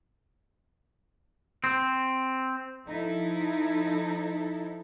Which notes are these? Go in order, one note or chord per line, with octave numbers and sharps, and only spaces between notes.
C4
F3 D#4 E4 A4